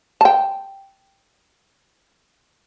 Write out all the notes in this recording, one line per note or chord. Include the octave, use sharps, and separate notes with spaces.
G5 A5